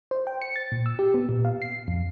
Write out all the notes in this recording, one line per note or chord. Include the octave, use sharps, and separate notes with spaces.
C5
G5
C#7
A6
A#2
E6
G4
B3
A#2
F5
C7
F2